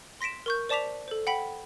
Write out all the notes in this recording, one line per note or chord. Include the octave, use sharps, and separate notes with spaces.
C6 A#6 B6 D7 E7
A#4 C#6 G6
C5 D5 A5 D6 B6 F7
A4 C5
F#5 G5 B5 B6